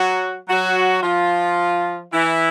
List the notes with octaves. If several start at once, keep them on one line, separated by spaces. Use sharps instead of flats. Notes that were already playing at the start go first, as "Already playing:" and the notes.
Already playing: F#3 F#4
F#3 F#4
F3 F4
E3 E4